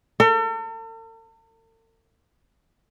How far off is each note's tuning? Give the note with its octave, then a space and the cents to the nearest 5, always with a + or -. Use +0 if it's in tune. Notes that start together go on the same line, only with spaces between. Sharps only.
A4 +45